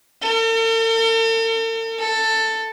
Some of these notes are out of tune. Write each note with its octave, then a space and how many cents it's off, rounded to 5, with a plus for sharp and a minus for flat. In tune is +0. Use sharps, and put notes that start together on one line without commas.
A4 +45
A4 +10